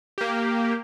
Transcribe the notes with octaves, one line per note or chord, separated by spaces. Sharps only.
A#3 G4